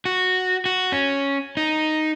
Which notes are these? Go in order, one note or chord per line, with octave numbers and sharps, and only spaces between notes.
F#4
F#4
C#4
D#4